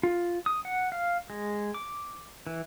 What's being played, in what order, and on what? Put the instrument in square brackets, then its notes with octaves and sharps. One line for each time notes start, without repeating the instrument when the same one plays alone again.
[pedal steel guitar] F4
D#6
F#5
F5
G#3
D6
E3